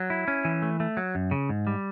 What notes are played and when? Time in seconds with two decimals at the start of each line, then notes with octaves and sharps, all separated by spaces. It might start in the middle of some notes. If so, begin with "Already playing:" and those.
Already playing: F#3
0.10 E4
0.28 C#4
0.45 E3
0.62 A3
0.80 A3
0.97 F#3
1.15 F#2
1.31 C#3
1.49 G#2
1.67 G3